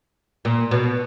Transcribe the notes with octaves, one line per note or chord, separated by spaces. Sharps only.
A#2
B2